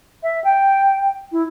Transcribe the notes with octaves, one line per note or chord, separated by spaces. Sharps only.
E5
G5
E4